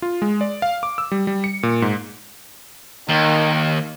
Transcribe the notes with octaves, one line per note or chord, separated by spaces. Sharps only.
F4
G#3
D5
F5
D6
E6
G3
G3
C#7
A#2
G#2
D#2 D#3